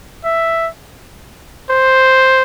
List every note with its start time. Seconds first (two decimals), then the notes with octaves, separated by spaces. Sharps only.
0.24 E5
1.70 C5